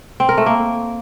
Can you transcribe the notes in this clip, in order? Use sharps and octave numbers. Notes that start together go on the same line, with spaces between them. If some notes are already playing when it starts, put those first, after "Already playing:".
C4
A#4
A3
A#3